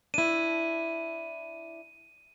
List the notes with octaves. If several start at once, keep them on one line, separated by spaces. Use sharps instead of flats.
D4 E4 D#7